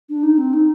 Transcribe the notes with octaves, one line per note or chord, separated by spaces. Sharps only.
D4
D#4
C4
D#4